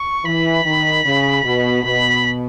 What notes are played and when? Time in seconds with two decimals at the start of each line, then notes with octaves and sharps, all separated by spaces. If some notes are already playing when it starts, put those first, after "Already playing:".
Already playing: C#6
0.25 E3 B5
0.65 D#3
1.05 C#3
1.44 B2
1.84 B2 B5